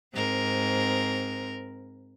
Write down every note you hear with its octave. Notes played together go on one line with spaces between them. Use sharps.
G#2 C4 A#4